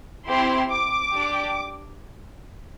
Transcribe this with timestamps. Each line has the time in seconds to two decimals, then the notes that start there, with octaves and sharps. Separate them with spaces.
0.27 C4 E4 G4 C6
0.70 D6
1.14 D4 G4